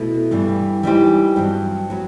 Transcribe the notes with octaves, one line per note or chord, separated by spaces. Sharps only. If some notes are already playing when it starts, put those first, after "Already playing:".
Already playing: B2 A3 E4 A4
G2 E3 G3
E3 G3 D#4 G4 C5
G2 F#3 C4
F#3 B3